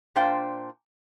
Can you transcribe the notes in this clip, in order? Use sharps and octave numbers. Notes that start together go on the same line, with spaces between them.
A#2 D4 C5 F5 G5